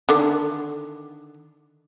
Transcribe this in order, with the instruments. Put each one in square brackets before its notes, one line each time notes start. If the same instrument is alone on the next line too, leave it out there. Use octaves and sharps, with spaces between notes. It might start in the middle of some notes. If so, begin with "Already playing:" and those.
[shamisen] D3 D#3